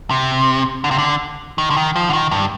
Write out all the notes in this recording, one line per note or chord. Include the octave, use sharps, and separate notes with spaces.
C3
D3
C3
D3
D#3
D3
D#3
F3
D3
D#3
G2